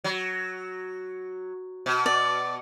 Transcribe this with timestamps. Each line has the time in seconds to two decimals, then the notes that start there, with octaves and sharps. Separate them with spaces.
0.04 F#3
1.86 B2
2.06 D5